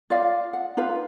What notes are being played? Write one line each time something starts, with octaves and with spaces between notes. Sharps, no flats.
F4 D5 D#5 F5
F#5
D#4 F4 B4 F5